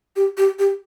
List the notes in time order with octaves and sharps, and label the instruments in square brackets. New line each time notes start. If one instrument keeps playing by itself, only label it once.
[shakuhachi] G4
G4
G4